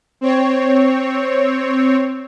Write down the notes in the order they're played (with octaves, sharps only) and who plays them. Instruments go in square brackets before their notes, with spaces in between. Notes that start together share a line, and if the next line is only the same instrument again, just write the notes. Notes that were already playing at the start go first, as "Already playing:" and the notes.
[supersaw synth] C4 C#5